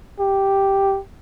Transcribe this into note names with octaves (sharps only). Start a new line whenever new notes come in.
G4